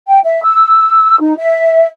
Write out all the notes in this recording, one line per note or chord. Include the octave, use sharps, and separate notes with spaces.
G5
E5
E6
D#4
E5